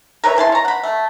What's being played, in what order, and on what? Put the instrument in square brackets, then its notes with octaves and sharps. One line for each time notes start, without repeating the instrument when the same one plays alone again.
[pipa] A#4 B4 C#5 E5
C#3 E4 A5 C6
C#5 A#5
F#5 B5
A3